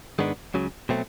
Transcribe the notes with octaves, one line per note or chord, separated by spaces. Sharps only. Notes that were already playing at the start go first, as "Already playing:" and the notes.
G#2 D#3 G#3 B3 D4
C#2 C#3 F#3
B2 F#3 A3 C4